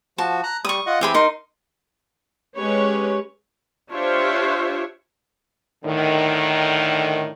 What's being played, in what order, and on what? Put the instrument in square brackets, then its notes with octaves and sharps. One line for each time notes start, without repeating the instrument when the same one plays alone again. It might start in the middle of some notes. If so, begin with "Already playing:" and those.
[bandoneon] F3 F#4 [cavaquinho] A5
[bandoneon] A#5 F#6
[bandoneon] G3 [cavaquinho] C#6 D#6
[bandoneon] F4 D#5 F#5
[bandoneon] E3 C4 [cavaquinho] G4 G#4 B5
[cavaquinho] D#4 C6 [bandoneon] A#4
[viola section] G#3 C#4 G4 B4 C#5
D4 F4 G4 C5 C#5 E5
[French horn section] A2 D3 D#3